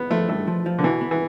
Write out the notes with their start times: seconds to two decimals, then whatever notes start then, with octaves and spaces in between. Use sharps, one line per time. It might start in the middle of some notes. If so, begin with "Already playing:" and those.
Already playing: B3
0.11 F3 A3
0.29 G2 A3
0.47 F3
0.66 F3
0.79 D3
0.84 B2 E3
1.01 B3
1.11 E3